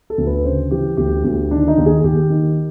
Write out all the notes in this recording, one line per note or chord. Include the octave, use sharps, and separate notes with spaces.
A4
D2
B4
C#3 C5
E3 G4
D2 G4
D2 G4
D#3 D4
D#4
D#2
G#4
D#2 G4
D#3